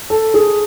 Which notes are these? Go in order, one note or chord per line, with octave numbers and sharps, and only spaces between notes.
A4
G#4